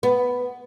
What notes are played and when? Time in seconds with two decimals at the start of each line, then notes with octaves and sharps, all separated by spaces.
0.03 B3